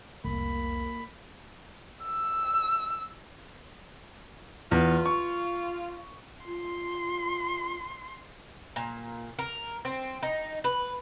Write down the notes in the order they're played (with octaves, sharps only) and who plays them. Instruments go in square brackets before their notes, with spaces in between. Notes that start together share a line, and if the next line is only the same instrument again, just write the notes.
[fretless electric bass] F1 [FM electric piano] C2 [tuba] A#3 [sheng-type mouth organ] B5
[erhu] E6
[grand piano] E2 [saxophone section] F4
[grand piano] C#6
[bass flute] F4 [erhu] C6
[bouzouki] A#2
A#4
C4
D#4
B4